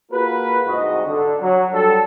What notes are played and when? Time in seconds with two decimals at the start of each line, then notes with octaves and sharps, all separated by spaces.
0.12 A#3 F4 F#4 G#4 A#4 B4
0.67 C2 G#2 F#4 D#5
1.06 D3
1.41 F#3
1.72 F#3 G3 D4 F#4 A4